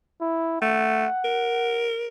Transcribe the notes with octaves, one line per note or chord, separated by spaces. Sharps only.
E4
A3 F#5
A#4